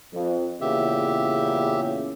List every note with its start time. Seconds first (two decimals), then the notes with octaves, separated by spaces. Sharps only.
0.14 F2
0.61 E2 A#2 C#3 G4 E5